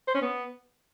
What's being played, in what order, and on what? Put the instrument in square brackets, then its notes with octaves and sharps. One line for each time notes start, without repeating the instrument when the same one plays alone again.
[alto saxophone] C5
C#4
B3